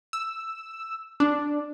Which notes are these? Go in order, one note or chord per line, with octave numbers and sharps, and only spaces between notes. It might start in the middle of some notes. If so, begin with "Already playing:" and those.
E6
D4